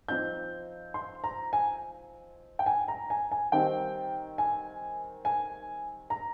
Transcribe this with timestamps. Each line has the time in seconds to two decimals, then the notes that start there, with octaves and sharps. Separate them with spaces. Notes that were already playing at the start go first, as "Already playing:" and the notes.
0.09 F3 C4 D#4 G6
0.94 C6
1.24 A#5
1.53 G#5
2.59 G5
2.66 G#5
2.88 A#5
3.10 G#5
3.32 G#5
3.52 D#3 G3 C4 D#4 G5
4.38 G#5
5.25 G#5
6.10 A#5